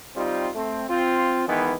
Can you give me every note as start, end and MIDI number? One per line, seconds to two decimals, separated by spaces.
0.16 0.48 55
0.16 0.48 60
0.16 0.48 63
0.16 0.48 65
0.55 0.84 57
0.55 0.84 60
0.90 1.46 60
0.90 1.46 65
1.48 1.73 51
1.48 1.73 52
1.48 1.73 56
1.48 1.73 59